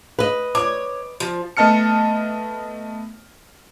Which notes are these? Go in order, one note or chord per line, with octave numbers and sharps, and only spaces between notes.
B4 D#5
C#5 D6
F3
A3 B3 D#5 A5 F6 C#7